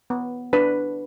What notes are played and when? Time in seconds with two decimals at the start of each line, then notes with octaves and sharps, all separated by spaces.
0.10 B3
0.53 D4 B4